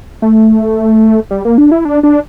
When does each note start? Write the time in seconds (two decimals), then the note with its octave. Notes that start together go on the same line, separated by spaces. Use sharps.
0.22 A3
1.31 G3
1.45 A#3
1.58 D4
1.71 E4
1.85 D4
2.03 D4